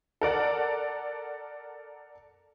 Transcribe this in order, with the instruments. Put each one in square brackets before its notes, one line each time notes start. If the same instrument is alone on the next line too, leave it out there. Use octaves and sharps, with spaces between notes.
[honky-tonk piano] A4 A#4 D5 F#5